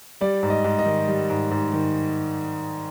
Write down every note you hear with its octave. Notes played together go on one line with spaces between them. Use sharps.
G3 D5
G#2
D#5
G#2
D#5
D#3
G3
G#2
G#2
D#3